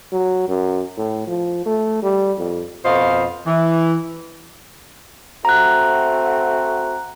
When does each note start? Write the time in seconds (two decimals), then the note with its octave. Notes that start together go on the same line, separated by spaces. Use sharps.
0.12 F#3
0.48 F#2
0.97 A2
1.27 F3
1.66 A3
2.02 G3
2.38 F2
2.85 F2 B2 F4 C5 D#5 F5
3.46 E3
5.45 A3 C4 F#4 A#5 F#6